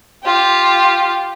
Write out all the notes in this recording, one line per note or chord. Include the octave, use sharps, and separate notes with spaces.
F4 G4